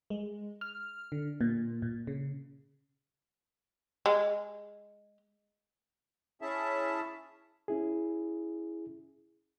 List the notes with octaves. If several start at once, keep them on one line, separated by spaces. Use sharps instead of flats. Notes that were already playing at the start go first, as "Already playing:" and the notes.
G#3
F6
D3
A#2
A#2
C#3
G#3
C#4 E4 G#4 E5 A5
C#4 E4 G#4